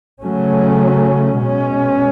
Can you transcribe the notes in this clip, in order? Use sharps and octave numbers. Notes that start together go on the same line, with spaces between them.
C#3 F#3 A3 C#4
B2 G#3 C#4